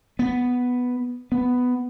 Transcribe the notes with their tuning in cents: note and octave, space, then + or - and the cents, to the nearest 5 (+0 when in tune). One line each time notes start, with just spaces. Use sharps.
B3 +0
B3 +10